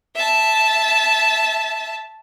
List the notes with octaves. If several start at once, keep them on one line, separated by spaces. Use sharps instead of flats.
E5 A5